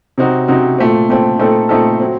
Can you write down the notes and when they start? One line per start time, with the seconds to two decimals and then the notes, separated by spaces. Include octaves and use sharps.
0.18 C3 F#3 C4 D#4 F#4
0.48 C3 F#3 C4 D#4 F#4
0.78 A#2 A3 C4
1.09 A#2 A3 C4
1.39 A#2 A3 C4 D#4 A4
1.69 A#2 A3 C4 D#4 A4
2.00 F#3 C4